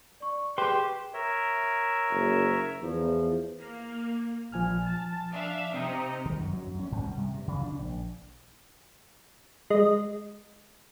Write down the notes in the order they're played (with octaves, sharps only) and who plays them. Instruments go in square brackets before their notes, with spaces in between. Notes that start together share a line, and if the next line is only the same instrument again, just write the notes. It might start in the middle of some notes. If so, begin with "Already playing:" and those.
[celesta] D5 C#6
[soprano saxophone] G4 [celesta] G#4 E7 [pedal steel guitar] B4 C6
[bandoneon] A#4 C#5 E5
[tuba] F#1
[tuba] E2 [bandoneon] F3
[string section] A#3
[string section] A#1 [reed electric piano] F3 G#5 F6
[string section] A5
D4 E5 F5
[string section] C3 D#4 [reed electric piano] C4 G5 A#5
[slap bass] D#3
F#2
F#3
F#2
C#4
G#2
G3
C3
G2
C#3
D4
A#1
[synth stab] G#3 D#5